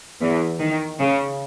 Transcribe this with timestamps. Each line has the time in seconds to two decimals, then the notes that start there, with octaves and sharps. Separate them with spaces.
0.21 E2 E3
0.60 D#3
0.99 C#3